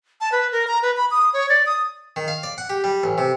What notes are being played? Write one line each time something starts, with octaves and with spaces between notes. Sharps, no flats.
A5
B4
A#4
A#5
B4
B5
D#6
C#5
D5
D#6
D#3
F5
D5
F#5
G4
G3
A1
C3